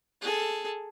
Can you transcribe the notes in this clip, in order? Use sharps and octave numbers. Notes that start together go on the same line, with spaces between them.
G#4 A4